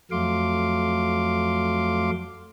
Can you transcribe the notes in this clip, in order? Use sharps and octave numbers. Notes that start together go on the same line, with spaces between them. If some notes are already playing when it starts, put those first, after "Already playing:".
F2 F#3 A3 F5 C6 D6